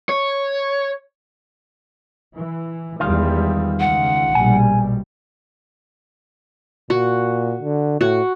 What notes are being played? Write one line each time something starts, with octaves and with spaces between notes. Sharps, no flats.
C#5
E3
E2 D#3 G3 G#3 F4
C#2 F#5
A#1 B2 G3 G#5
A#2 F#4
D3
A2 F#4